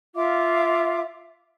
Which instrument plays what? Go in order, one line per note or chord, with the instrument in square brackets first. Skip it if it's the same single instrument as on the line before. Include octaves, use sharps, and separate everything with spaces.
[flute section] F4 E5 F5 D6